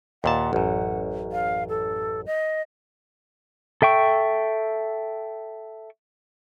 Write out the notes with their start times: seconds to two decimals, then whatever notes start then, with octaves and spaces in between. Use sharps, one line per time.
0.24 D#2 A#2 F#5 A5
0.53 A1 F#2
1.32 F5
1.69 A4
2.26 D#5
3.82 A4 E5 G5 C#6